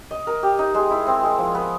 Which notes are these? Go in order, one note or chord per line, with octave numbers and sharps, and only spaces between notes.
D#5
A#4
G4
D#4
G#3
E4
C4
G#3
F3
B3